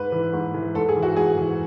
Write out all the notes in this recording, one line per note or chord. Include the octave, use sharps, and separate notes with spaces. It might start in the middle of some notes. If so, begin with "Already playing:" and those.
Already playing: G#2 B4
E3
G#2
E3
G#2 A4
G#4
E3
F#4
G#2 G#4
E3